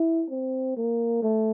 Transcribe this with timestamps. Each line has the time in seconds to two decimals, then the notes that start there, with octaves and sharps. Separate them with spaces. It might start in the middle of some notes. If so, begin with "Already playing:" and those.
Already playing: E4
0.30 C4
0.76 A#3
1.23 A3